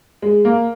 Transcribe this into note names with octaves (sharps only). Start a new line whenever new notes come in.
G#3
A#3